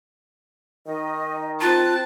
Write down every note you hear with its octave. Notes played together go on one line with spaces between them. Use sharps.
D#3 D#5
C4 F4 A5 F#6